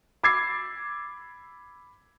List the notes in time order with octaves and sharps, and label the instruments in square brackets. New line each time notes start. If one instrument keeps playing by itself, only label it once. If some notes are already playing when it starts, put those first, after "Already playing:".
[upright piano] B5 D6 E6 G#6 A6 C7